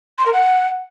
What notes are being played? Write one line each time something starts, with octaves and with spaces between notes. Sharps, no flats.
C6
A#4
F#5